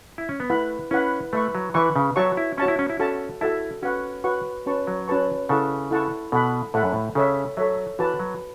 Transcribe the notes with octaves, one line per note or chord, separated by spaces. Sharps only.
E4
C#4
B3
A3 E4 B4 F#5 B5
C#4 E4 B4 F#5 B5
A3 B4 E5 C#6
F#3
E3 B4 E5 C#6
C#3
F#3 F#4 C#5 E5 A5 C#6
E4
C#4 F#4 C#5 E5 A5 C#6
E4
C#4
E4
C#4 F#4 A4 E5 A5
E4 F#4 A4 E5 A5
C#4 F#4 B4 F#5 C#6
F#4 B4 F#5 C#6
C#4 F#4 B4 A5 C#6
F#3
C#4 F#4 B4 A5 C#6
C#3 E4 A4 F#5 A5 C#6
E4 A4 F#5 A5 C#6
B2 A4 F#5 B5
A2 A4 F#5 B5
F#2
A2
C#3 A4 C#5 E5
F#3 A4 C#5 E5
E3 F#4 B4 A5
F#3